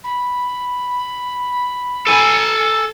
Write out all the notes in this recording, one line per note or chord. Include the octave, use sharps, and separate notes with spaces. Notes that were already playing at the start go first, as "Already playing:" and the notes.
B5
A4 G#5